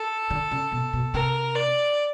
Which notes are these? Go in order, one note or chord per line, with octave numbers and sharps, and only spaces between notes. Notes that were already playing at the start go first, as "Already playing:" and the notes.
Already playing: A4
D3
C#3
B2
B2
C3 A#4
D5